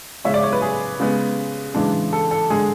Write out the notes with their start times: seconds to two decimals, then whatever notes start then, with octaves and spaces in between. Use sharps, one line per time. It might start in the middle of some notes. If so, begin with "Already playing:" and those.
0.25 C#3 G#3 C#4 E5
0.34 D5
0.43 C#5
0.53 B4
0.62 G#4
1.00 C#3 G#3 B3
1.75 C#3 E3 G#3 D4
2.13 A4
2.31 A4
2.50 D3 G#3 G#4